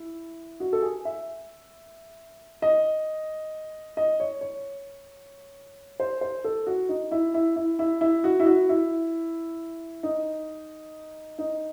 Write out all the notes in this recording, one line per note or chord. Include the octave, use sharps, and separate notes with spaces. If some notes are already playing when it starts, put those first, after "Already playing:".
Already playing: E4
F#4
A4
G#4
E5
D#5
D#5
C#5
C#5
C5
C5
A4
F#4
D#4
E4
E4
E4
E4
E4
F#4
E4
F#4
E4
D#4
D#4